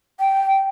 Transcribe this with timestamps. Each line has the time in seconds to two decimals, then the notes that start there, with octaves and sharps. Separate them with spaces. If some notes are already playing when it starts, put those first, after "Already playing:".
0.20 G5